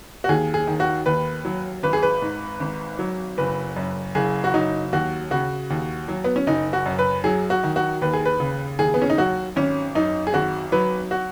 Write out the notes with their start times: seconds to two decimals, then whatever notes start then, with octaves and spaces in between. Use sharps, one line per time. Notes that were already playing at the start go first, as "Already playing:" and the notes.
0.24 F#4
0.29 D#2 G#4
0.54 G#4
0.67 D#3
0.80 F#4
1.06 D#2 B4
1.45 F#3
1.83 G#1 B4
1.93 G#4
2.03 B4
2.22 G#2
2.60 G#1
2.99 F#3
3.38 F#1 B4
3.76 F#2
4.15 F#1 G#4
4.44 F#4
4.54 F#3 D#4
4.92 D#2 F#4
5.31 C#3 F#4
5.70 D#2
6.08 F#3
6.24 B3
6.36 C#4
6.47 F#1 D#4
6.73 F#4
6.86 F#2
6.99 B4
7.24 F#3 G#4
7.50 F#4
7.63 D#3
7.76 F#4
8.01 D#2 B4
8.13 G#4
8.25 B4
8.40 C#3
8.79 D#2 G#4
8.94 B3
9.02 C#4
9.10 D#4
9.18 F#3 F#4
9.56 G#1 C#4
9.95 F#2 D#4
10.27 G#4
10.34 G#1 F#4
10.72 F#3 B4
11.11 F#4